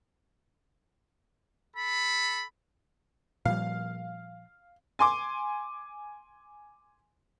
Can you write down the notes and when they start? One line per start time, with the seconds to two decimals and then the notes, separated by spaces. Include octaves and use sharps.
1.75 A4 B5
3.45 A#2 F3 G3 F5
4.99 G#5 C6 D6